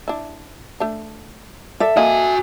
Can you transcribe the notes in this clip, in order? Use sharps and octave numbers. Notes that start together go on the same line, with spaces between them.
D4 E4
A3 D4
A4 D5 E5
A#3 F#4 D#5 G#5 B5